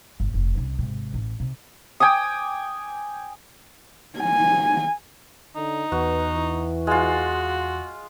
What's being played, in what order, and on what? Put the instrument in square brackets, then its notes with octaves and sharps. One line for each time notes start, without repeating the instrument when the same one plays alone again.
[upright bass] G1
F1
C2 C#4
G#1 C3
A1
C3
[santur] G5 G#5 D6 D#6
[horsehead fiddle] G#5
[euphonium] D3 [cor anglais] D#4
[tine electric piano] E2 [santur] F#4 [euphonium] B4
[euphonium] E3
[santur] G#3 F4 [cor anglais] F#4